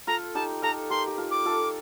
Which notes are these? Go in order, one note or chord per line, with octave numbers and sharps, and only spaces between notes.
F4 A4 A#5
D#4 G4 A5
F4 A4 A#5
G4 A#4 C6
G4
F4 A4
D6
F4 A4